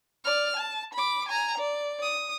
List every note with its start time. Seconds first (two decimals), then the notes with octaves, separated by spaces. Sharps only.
0.24 D5 F6
0.56 A5
0.93 B5 D6
1.29 G#5 A#5
1.58 D5
2.03 D#6